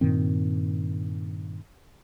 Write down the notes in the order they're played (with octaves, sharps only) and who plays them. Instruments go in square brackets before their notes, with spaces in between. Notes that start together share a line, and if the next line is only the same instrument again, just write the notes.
[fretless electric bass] G2 A#2 D#3 C4